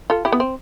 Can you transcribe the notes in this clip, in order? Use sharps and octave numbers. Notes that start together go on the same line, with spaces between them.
F4 A4
E4 G4
B3
C4